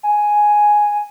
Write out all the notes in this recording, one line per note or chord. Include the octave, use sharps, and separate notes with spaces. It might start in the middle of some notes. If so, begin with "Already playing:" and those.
G#5